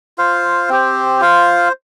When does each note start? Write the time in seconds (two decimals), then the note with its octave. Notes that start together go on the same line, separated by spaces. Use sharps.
0.18 F4 C5 F5
0.69 C4 G4 C5
1.21 F4 C5 F5